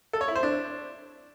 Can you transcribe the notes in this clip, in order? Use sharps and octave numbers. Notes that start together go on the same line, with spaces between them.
A4
C#5
E4
C5
D4